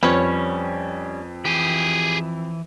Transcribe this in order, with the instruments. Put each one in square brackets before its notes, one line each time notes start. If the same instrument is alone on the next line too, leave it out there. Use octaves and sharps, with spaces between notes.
[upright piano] F2 [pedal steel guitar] G3 C#4 [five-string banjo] B4 C#5
[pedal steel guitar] E3 [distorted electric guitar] G4 G#4